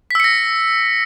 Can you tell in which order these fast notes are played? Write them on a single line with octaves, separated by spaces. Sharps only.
B6 E6 C#7 A#6